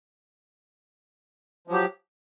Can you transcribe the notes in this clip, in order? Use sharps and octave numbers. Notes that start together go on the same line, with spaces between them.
F3 F#3 G4